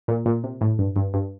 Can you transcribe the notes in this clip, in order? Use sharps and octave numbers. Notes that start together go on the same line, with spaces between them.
A#2
A#2
C3
A2
G2
G2
G2